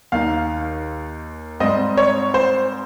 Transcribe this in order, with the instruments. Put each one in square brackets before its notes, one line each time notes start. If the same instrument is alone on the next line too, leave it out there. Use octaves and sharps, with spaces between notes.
[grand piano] D#2 D#3 A#3 D#4 F5
G#2 G3 C4 D#5
C#5
C5